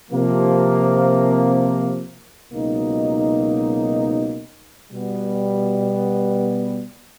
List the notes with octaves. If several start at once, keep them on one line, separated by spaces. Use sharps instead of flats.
C3 F3 A#3
C#2 B2 F#3 A#3 D#4
B2 G3 B3